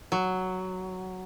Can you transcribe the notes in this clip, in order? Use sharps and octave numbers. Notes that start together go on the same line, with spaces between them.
F#3